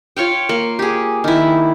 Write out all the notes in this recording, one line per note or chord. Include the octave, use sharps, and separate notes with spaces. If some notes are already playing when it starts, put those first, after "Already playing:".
F4 C#5 F5 G5
A#3
G4 G#4
D#3 E4